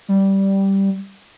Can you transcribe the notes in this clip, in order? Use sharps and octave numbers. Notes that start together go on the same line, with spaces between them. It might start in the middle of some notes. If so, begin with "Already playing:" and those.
G3